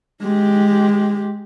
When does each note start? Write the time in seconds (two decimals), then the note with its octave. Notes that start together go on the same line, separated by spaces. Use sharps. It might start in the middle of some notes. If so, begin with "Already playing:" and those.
0.22 G#3 G4